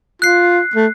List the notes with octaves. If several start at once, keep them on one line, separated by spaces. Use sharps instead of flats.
F4 F#6 C7
A3